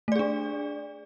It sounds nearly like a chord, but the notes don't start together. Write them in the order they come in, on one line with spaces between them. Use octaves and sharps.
A3 D5 G#4 D4